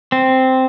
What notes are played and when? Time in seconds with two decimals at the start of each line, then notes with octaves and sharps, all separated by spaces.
0.12 C4